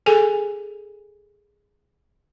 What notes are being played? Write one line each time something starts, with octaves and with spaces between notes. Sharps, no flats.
G#4 A4 G#5